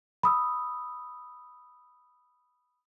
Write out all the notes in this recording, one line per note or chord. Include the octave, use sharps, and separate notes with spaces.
B5 D#6 E6